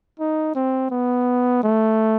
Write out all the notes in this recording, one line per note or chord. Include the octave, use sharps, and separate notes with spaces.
D#4
C4
B3
A3